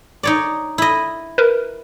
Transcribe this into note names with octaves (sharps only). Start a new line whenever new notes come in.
D#4 C#5 D5
E4 D#5
A#4 B4